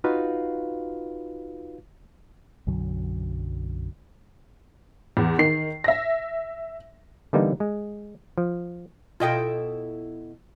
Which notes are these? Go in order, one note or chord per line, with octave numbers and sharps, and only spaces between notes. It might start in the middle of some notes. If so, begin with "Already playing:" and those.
D#4 F4 F#4 B4 F5
B1 F#2 D3 F#3
E2
D#3 C7
E5 A#6
D3 E3 G3 A#3 B3 D#4
G#3
F3
B2 E4 F4 A4 D#5 G5